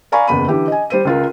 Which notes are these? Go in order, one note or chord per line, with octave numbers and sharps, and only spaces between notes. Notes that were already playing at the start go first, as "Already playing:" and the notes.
D5 F5 G#5 A#5 B5 C#6
F#1 E2 B5 D#7
D3 E3 G4
D#5 G#5
G3 C5 D#7
C#2 F4 A#4